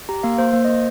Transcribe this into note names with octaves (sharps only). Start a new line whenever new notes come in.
G4 A#5
A#3 F5
A#3 C5
A#3 C5
D#5
A#3